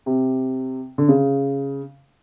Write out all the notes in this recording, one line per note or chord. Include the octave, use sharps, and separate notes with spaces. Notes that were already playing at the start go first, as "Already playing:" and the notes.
C3
D3
C#3